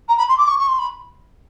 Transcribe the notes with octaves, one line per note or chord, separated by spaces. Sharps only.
A#5
B5
C6
D6
C#6
C#6
C6
B5